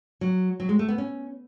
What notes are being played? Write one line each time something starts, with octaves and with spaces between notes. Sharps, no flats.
F#3
F#3
G#3
A3
B3
C#4